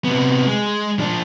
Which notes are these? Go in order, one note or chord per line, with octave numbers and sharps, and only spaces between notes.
C3 B3
G#3
F3 D4